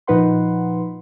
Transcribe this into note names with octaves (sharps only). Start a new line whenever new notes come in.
A#2 F3 D#4 B4 F#5 C6